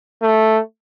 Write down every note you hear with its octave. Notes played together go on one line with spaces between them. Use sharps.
A3